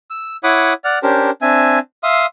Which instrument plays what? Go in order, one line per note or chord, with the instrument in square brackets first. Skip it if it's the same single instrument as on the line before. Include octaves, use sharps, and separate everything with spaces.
[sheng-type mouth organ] E6
E4 C#5 F#5 B5 D6 D#6
D5 F#5 F6
C#4 D4 G4 A#4 C5
C4 D4 E5 G#5
E5 F5 C6 D#6